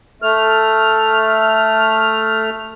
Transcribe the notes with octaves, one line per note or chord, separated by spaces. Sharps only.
A3 F6